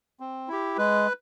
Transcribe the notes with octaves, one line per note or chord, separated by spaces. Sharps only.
C4
E4 G4
G#3 B4